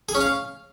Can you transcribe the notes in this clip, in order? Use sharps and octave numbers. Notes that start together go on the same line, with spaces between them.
G#4
C#4
F5